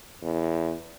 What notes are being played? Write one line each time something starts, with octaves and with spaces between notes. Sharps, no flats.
E2